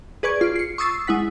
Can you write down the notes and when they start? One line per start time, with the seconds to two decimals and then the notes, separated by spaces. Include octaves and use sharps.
0.23 G#4 B4 D5 C#6 G#6
0.41 F4 D7
0.56 C7 C#7
0.78 C#6 D#6 E6 A6 C7
1.07 G#3 E4 F#5 B6